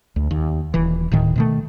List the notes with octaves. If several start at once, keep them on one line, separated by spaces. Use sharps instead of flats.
D2
D#2
D#1 E3
D1 A2 D#3
B2 D#3 A3